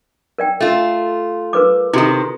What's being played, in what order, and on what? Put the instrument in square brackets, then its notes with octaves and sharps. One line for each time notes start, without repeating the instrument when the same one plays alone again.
[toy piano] A#4 D5 G5
[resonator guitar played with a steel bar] A3 F4
[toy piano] A#4 B4 D6
[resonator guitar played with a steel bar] C3 D#3 [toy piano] E4 F#4 A4